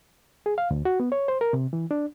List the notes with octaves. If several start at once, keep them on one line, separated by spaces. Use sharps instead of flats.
G#4
F5
D2
F#4
B3
C#5
C5
A#4
C3
E3
D4